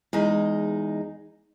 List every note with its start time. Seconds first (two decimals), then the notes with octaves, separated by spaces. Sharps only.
0.13 E2 G#3 D#4